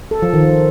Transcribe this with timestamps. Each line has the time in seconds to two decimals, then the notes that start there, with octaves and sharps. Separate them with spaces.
0.11 A4
0.22 F3
0.33 D#3